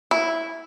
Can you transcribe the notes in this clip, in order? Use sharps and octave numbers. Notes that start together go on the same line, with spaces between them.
E4